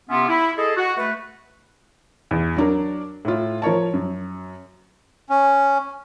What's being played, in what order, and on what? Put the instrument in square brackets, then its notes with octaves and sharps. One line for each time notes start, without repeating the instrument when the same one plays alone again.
[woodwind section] C3 B3 C#4 F4 E5 C6
E4
G#4 A4 D#5
F#4
A3 B4
[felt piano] E2
F#3 D4 A#4
A2 F4
F3 A#4 C#5 A5
F#2
[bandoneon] C#4